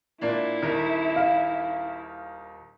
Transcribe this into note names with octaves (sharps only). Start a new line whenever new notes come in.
A#2 A#3 D4 E4
D#1 D#3 A#4
F5